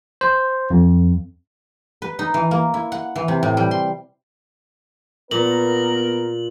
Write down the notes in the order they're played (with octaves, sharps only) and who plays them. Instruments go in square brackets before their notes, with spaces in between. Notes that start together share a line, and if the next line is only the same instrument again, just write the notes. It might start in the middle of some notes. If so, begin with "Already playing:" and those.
[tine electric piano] C5
F2
[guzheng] B4
D#4
E3
A#3
E4
F#5
E3
C3
A2
G3
C6
[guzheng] A#2 [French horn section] B3 [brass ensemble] A#4 [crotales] F#7